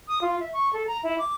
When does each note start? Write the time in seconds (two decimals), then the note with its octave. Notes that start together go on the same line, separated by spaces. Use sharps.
0.08 D#6
0.21 F4
0.40 E5
0.53 C#6
0.73 A4
0.87 A#5
1.03 E4
1.18 D6